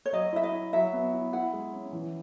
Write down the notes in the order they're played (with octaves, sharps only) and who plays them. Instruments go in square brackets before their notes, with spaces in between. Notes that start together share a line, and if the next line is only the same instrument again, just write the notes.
[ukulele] C#5
[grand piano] F#3 [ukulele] D#5
[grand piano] E4 [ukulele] E5
[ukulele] D#5
[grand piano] E4
[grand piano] F#3 [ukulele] E5
[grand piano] B3
E4
[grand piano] E4 [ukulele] F#5
[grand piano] G#3
C#4
E3